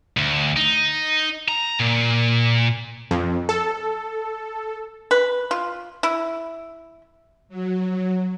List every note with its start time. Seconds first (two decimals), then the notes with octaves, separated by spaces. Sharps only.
0.17 D2
0.56 D#4
1.48 A#5
1.80 A#2
3.11 F2
3.49 A4
5.11 B4
5.51 F4
6.03 E4
7.49 F#3